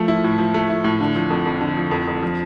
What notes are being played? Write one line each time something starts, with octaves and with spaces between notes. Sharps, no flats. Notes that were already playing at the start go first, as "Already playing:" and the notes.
Already playing: F3 A3
E4
A2
F3
A3
E4
A2
D3
F3
F2
F2
D3
F3
F2
F2
F3